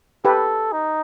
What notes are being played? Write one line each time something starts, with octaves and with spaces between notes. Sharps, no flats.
G4 A4 B4
D#4